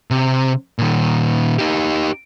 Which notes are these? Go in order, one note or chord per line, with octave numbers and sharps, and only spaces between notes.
C3
A#2 D#3
D#4 G4